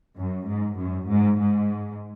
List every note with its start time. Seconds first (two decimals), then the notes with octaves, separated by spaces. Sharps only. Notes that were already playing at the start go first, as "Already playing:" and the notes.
0.17 F#2
0.47 G#2
0.78 F#2
1.08 G#2
1.38 G#2